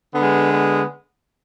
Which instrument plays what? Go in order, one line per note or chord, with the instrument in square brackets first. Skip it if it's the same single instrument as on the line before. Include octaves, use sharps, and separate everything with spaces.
[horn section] D3 G#3 B3
B3